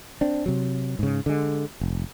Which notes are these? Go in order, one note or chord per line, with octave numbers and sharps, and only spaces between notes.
C4 D4
C3 F#3
G#2 C#3
D3 G#3
F1